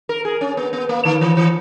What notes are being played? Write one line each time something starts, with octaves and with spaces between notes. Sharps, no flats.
A#4
G#4
C#4
B3
B3
A#3
D#3
E3
E3